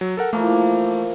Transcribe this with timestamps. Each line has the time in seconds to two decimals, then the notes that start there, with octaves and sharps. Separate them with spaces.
0.01 F#3
0.17 A4 A#4 F#5
0.33 E3 F3 A3 A#3